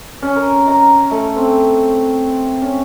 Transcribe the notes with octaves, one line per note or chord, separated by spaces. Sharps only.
C#4
A#4
A#5
A3
C4
C#4